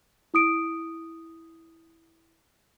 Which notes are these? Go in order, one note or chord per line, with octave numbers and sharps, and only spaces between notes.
E4 D#6 D7